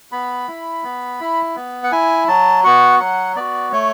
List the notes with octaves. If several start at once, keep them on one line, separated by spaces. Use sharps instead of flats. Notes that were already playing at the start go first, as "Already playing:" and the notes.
B3 B5
E4
B3
E4
B3
F#5
E4 G#5
F#3 A5
B3 F#4 F#5
F#3 F#5
B3 F#4 D5
A3 C#5